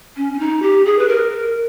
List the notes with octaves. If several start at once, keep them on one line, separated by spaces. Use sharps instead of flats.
C#4
C#4
D#4
G4
G#4
B4
A#4